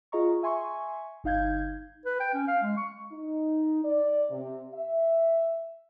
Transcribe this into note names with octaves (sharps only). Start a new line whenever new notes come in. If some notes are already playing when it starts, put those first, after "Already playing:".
F4 G#4 D#5 A#5 C#6
E5 G#5 C6 C#6
G1 D#4 F5 G6 G#6
B4
G5
C#4
F5
G#3
C#6
D#4
D5
C3
E5